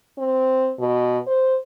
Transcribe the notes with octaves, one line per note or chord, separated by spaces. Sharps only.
C4
B2
C5